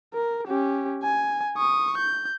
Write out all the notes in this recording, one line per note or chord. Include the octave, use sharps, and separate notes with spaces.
A#4
C#4 G4
G#5
C#6 D#6
G6